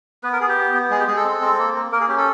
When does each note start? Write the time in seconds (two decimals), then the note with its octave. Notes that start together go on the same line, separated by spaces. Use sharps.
0.23 B3 B4
0.33 A#4
0.41 B3 G#4
0.49 G4
0.57 B3
0.74 B3
0.90 G#3 G#4
0.99 G4
1.07 G#3 G#4
1.17 A4
1.24 C4
1.41 C4
1.59 A#3
1.75 A#3
1.92 A#3 A#4
2.00 G#4
2.08 C#4 G4
2.18 A4